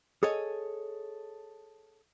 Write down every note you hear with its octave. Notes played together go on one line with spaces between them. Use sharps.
G#4 A4 C#5 D#5